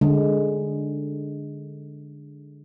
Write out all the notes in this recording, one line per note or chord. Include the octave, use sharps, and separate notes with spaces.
D3 G#3